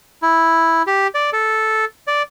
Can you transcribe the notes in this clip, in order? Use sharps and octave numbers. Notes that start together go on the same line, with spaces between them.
E4
G4
D5
A4
D5